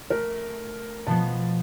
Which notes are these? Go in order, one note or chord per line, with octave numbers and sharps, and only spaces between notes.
A3 A#4
B2 F3 B3 A5